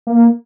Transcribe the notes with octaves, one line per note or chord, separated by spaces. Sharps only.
A#3